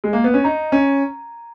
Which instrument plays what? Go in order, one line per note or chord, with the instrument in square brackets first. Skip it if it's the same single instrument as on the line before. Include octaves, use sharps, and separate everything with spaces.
[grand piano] G#3
A#3
B3
C#4
[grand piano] D#4 [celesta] A#5
[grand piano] C#4